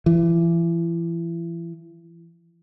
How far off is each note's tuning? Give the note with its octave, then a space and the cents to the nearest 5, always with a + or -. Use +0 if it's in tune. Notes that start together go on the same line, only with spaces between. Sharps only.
E3 +30